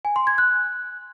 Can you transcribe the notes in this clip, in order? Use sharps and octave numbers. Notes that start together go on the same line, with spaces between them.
G#5
C6
G#6
F#6